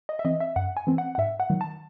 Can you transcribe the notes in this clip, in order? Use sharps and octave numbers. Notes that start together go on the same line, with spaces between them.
D#5
E5
E3 C4 D#5
E5
F#2 F#5
G#5
E3 C4
F#5
F#5
G#2 E5
F#5
D#3 F#3
A5